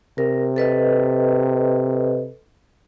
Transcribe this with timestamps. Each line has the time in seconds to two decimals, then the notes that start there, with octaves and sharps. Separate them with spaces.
0.18 C3 A#4
0.56 A4 B4 D#5